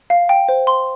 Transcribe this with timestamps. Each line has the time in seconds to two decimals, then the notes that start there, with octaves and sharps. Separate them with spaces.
0.10 F5
0.29 G5
0.48 C5
0.67 C6